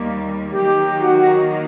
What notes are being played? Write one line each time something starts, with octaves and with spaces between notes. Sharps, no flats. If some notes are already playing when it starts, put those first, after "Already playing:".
Already playing: D#2 D#3 G3 A#3
D#3 F#3 A#3 D#4 G4
F#4